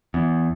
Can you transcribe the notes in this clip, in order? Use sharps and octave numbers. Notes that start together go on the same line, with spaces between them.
E2